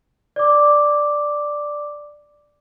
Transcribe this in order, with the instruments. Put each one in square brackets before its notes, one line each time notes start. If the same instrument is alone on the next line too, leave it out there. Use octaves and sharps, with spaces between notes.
[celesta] D5 D6